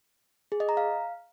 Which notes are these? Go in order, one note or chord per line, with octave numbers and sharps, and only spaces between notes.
G#4
D#5
A#5
F5